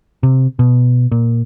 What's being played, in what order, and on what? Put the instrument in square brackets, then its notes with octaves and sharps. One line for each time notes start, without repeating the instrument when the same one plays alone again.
[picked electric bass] C3
B2
A#2